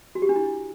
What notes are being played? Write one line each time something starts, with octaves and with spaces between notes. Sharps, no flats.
F#4
G4
D4
E4